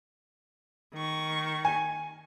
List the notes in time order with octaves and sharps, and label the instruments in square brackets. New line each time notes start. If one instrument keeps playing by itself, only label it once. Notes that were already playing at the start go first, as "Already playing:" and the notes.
[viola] D#3 C#6
[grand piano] G#5